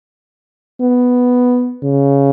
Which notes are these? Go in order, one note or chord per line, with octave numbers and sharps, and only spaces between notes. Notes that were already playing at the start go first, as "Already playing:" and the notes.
B3
C#3